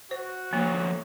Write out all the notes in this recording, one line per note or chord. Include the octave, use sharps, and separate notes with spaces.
F#4 C5
F3 A3 A#3 C#5